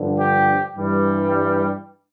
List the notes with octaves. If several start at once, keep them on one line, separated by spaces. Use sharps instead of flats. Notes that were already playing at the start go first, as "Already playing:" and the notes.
Already playing: G2 D3 F3
G4
G2 E3 G3